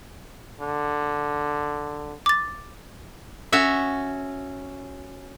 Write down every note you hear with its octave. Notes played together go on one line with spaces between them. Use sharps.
D3
D6 A6
C#4 F#4 E5